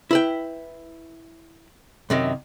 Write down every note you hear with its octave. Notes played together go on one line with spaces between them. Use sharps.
E4 B4 G5
F#2 C3 D#3